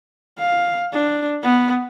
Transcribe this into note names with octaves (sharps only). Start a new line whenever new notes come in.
F5
D4
B3